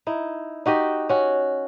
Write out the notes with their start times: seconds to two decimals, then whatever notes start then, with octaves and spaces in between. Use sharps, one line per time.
0.07 D#4 E4
0.66 D#4 F#4 G4 D#5
1.09 C#4 F#4